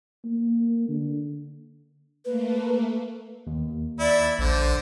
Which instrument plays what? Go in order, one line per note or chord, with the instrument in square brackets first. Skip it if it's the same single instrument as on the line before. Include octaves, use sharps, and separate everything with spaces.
[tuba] A#3
D3
[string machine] A3 A#3 [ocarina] B4
[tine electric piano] D#2
[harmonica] E4 [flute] D5
[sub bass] A#1 [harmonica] D3 [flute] C5